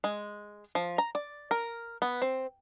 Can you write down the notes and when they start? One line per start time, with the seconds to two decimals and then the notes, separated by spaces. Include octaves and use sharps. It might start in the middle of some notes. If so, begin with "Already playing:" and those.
0.04 G#3
0.75 F3
0.98 A#5
1.15 D5
1.51 A#4
2.02 B3
2.22 C4